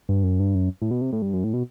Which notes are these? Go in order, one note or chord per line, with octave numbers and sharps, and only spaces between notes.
G2
F#2
G2
F#2
A2
B2
C3
A2
G2
F#2
A2
B2